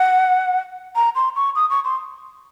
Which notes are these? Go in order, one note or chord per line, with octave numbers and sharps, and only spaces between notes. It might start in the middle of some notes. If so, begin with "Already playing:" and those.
Already playing: F#5
A#5
C6
C#6
D#6
C#6
C6